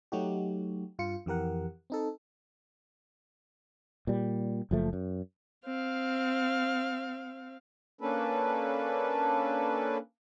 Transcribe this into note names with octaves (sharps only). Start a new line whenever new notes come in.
F#3 A3 D#4 F#4 G4
G2 F4 C#7
F2 E3 G4 A#4 F#5
C4 D#4 A4
A#2 G3
F#1 F3 A3
F#2
C4 F5
A#3 C#4 D4 A4 B4